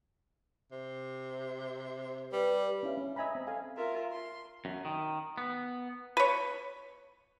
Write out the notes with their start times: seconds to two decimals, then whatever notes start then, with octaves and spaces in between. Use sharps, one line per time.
0.72 C3
2.32 G3 B4
2.83 C#4 E4 F5
2.98 C#4
3.16 D#5 E5 G#5 A#5 B5
3.35 C4
3.47 A4 F5 G#5
3.76 F4 A#4 E5
4.10 C6
4.65 F#2
4.85 D#3
5.38 B3
6.17 B4 C#5